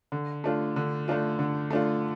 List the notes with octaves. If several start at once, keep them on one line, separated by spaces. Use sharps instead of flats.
D3
A3 D4 F4
D3
A3 D4 F4
D3
A3 D4 F4